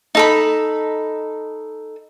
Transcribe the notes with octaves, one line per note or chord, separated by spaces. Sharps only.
D#4 A4 B5